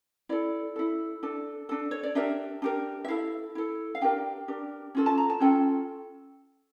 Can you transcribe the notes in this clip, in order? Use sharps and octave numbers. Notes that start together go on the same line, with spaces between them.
E4 A4 D5
E4 A4
D4 A4
D4 A4
C#5
D5
D4 G4 A#4 E5
D4 G4 A#4
E5
E4 A4 F5
E4 A4
F5
D4 G4 A#4 G5
D4 G4 A#4
C#4 F4 A4
A5
A#5
A5
C#4 F4 A4 G5